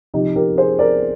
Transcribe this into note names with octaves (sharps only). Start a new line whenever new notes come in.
C3 F3 D#4 G4
G4 A#4
G#4 C5
A#4 D5